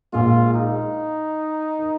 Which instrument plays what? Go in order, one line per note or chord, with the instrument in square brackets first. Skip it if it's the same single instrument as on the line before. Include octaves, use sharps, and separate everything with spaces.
[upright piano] A#1 A#2 G#3 [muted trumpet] F4
[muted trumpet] D#4
[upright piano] D#3